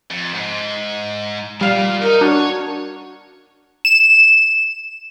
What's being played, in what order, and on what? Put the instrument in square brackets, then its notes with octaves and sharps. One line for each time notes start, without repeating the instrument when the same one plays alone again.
[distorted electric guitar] F2
G#2
[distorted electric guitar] A#2 [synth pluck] G3 F5
[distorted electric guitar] D#4 [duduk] A#4
[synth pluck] D4 [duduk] F#4 [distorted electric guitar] C#5
[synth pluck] E7